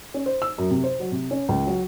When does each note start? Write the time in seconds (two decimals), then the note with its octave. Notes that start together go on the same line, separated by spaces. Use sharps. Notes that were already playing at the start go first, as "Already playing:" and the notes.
0.14 C#4
0.26 C5
0.42 E6
0.58 F#2
0.71 C3
0.84 C5
1.00 F#3
1.12 C3
1.31 C#4
1.49 C#2
1.67 F#3